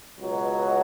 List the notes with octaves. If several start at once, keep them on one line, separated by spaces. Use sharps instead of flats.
C#2 B2 F#3